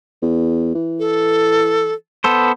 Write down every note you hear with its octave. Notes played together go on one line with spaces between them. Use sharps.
E2
E3
A4
B3 A4 C5